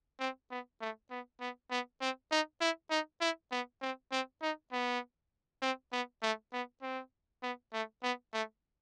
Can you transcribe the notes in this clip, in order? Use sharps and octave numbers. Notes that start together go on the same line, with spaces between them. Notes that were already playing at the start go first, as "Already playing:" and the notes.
C4
B3
A3
B3
B3
B3
C4
D#4
E4
D#4
E4
B3
C4
C4
D#4
B3
C4
B3
A3
B3
C4
B3
A3
B3
A3